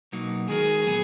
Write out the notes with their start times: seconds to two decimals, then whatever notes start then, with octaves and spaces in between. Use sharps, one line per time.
0.12 B2 F#3 A#3 D#4 F#4
0.49 D#3 G#3 D#4 F#4 G#4 A#4
0.87 A#2 F#3 B3